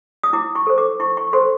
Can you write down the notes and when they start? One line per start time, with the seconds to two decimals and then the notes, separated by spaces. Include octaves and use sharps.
0.24 D#6
0.33 E4 D6
0.55 C#6
0.67 A4 C5
0.78 D6
1.00 E4 C#6
1.17 C#6
1.33 A4 C5 C6